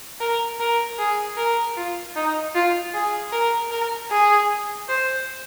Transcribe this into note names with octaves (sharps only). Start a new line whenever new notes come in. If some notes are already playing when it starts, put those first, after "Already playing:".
A#4
A#4
G#4
A#4
F4
D#4
F4
G#4
A#4
A#4
G#4
C5